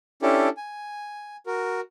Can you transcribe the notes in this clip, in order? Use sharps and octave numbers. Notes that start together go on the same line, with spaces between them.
C#4 D4 E4 G4 A4
G#5
F#4 A#4